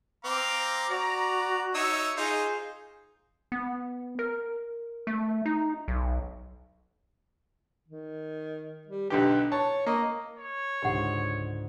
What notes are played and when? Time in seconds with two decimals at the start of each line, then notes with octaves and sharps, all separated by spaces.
0.25 C4 F5 A#5 D6
0.90 F#4 D5
1.75 D#4 C#5 E5 E6
2.17 D#4 F4 G#4 C5
3.52 B3
4.19 A#4
5.07 A3
5.46 D#4
5.88 B1
7.88 D#3
8.87 G3
9.10 B1 D3 G4 B4
9.52 C#5 A5
9.86 A#3 D#5
10.38 C#5
10.82 C#2 G#2 D3 G4 F#5